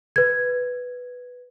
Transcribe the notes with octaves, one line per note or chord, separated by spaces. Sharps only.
B4 G#6